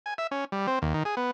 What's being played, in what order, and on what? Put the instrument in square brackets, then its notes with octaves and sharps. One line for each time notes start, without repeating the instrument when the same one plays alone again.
[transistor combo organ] G#5
E5
C#4
G3
C4
D#2
D#3
G#4
B3